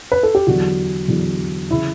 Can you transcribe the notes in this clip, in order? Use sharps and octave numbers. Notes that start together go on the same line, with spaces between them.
B4
A4
G4
E2 D3 F#3 F#4
E2 D3 F#3
C#3 E3 E4